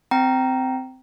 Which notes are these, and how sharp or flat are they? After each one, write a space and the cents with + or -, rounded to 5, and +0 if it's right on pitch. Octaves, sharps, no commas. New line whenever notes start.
C4 -15 G5 -15 A#5 +0